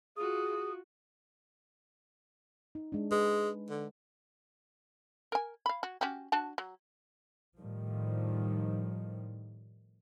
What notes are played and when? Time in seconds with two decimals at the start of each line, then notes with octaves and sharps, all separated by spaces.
0.17 F4 F#4 G#4 D#6
2.75 D#4
2.92 G#3 D4
3.11 G#3 B4
3.69 D3
5.32 A#4 G#5
5.66 F5 B5
5.83 F#4
6.01 C#4 F#4 G4
6.32 D4 F#4 A5
6.58 F#3
7.57 A2 D#3 F3 G3